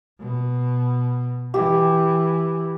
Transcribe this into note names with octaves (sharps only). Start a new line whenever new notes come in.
B2
E3 G4